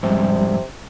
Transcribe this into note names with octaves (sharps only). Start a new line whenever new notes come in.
F2 G#2 C3 G3